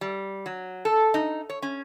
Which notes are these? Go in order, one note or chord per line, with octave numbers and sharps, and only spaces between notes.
G3
F#3
A4
D#4
C#5
C#4